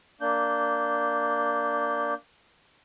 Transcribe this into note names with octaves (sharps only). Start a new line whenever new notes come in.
A#3 D4 G6